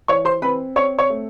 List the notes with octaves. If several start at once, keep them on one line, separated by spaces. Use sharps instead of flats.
E3 C#5 C#6
C5 C6
C4 B4 B5
C4 C#5 C#6
C#5 C#6
A3